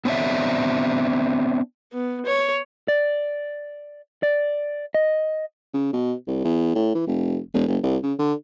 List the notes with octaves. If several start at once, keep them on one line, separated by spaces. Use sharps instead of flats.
B3 C4 D4 C#5 D5 E5
B3
C#5
D5
D5
D#5
C#3
B2
C2
E2
A2
E3
F1
E1
F#1
C2
C#3
D3